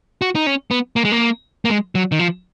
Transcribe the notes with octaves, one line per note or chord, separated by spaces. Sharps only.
F#4
D#4
C#4
B3
A#3
G#3
A#3
A#3
G#3
F#3
D#3
F3